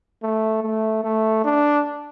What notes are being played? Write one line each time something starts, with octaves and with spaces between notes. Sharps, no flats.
A3
A3
A3
D4